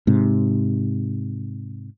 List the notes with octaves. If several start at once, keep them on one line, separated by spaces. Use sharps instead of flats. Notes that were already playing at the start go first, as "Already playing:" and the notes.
G#2 C3